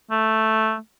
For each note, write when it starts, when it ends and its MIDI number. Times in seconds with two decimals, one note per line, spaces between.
0.11 0.76 57